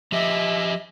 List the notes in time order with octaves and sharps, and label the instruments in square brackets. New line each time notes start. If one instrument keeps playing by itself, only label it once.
[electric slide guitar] F3 G4 D#5 [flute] E5